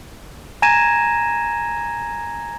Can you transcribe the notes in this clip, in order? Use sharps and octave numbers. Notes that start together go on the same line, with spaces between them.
G#5 A#5 G#6 A#6 D#7 E7